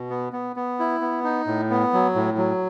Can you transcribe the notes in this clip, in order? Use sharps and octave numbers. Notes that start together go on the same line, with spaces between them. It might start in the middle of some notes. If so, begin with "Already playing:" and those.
Already playing: B2
B3
B3
B3
E4
B3
D#4
A2
B3
F#3
A2
F#3